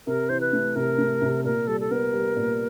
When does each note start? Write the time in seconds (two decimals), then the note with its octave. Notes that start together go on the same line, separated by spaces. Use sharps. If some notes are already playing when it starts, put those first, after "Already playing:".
0.07 C3 A#4
0.29 E3 C5
0.41 B4
0.53 A3
0.76 C3 A#4
0.98 A3
1.21 C3
1.44 A#2 A#4
1.67 G3 A4
1.81 A4
1.90 B3 A#4
2.13 G3
2.36 A#2